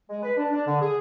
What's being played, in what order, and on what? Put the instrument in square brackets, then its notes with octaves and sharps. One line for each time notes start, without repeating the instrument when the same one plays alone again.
[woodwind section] G#3
B4
D4
D4
D3
G#4